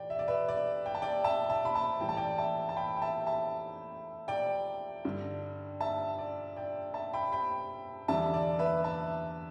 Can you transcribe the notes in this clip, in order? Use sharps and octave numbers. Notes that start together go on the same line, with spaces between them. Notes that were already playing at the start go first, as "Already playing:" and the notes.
Already playing: A2 E3 D5 G5
E5
D5
B4 E5
D5
G5
A5
D5 G5
E5 A5
E5 A5
B5
E5 A5
A2 E3 G3 G5
A5
D5 G5
E5 A5
A5
G5 B5
G5
E5 A5
E5 A5
D5 G5
G2 D3 G3
E5 A5
D5
D5 G5
E5 A5
G5 B5
G5 B5
E2 D3 G3 E5 A5
D5
B4 E5
E5 A5